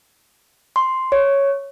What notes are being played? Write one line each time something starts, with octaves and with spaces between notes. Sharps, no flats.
C6
C#5